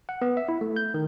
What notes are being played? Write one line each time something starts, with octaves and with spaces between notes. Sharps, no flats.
F#5
B3
E5
E4
A3
G6
D#3